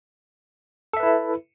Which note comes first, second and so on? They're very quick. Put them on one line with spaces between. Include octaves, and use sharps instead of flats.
A4 E5 B4 E4